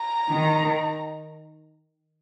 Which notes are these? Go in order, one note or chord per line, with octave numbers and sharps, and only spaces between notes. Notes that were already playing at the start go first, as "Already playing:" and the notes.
Already playing: A#5
D#3